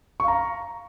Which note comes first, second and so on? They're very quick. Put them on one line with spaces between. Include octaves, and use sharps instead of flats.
C#6 F5 A#5